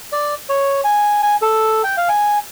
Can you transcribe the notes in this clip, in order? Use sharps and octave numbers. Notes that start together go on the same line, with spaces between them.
D5
C#5
G#5
G#5
A4
G5
F5
G#5